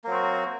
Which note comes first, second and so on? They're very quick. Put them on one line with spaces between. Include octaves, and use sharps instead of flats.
A#3 F#3 C4 F#4